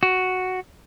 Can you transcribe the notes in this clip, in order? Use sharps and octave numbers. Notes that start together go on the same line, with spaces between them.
F#4